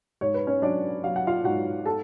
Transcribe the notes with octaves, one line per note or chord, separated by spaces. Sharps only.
G#2 C#5
B4
C#4 C#5
F#3 D4 D5
F#3 F5
F#5
F4 F5
G#2 F#4 F#5
A4 A5